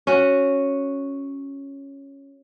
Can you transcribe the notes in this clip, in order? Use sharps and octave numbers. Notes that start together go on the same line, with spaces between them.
C#4 F#4